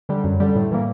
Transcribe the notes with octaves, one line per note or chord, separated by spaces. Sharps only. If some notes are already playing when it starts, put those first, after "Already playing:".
D3 G3
F#2
D3 G3
A2
E3 G3 A#3